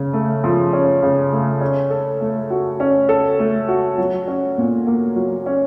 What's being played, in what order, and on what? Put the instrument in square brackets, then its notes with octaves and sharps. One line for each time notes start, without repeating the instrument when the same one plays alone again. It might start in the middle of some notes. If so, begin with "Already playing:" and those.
Already playing: [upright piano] C#3 C#4
A3
F3
C#4
C#3
A3
C#4
A4
A3
F#4
C#4
A4
A3
F#4
F#3
C#4
A#2
A#3
F#3
C#4